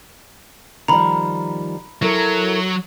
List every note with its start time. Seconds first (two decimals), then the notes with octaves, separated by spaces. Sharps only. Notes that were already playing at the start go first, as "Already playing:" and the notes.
0.88 D#3 F3 G3 A#5 B5
2.02 F#3 E4 A4 A#4